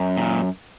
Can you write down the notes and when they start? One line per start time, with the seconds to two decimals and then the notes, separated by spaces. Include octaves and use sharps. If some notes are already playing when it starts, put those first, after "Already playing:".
Already playing: F#2
0.17 A#2